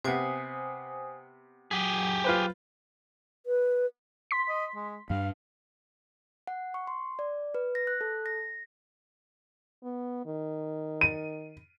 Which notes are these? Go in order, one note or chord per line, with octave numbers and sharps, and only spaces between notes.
C3 B3 C5 G#5 D#6
F#3 G4 G#4
F4 B4 C5
B4
C6 B6
D#5
G#3
G2 G3 F5
F#5
C#6
C6
D5
B4
A#6
F#6
A4
A#6
B3
D#3
D#7